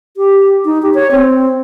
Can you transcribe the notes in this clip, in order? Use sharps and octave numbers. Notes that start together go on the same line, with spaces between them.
G4
D#4
G4
C#5
C4